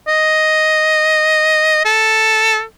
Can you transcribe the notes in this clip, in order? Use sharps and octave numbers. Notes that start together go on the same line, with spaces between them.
D#5
A4